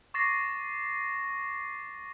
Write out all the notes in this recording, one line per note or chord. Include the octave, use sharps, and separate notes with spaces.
C#6 D6 A6 A#6 C7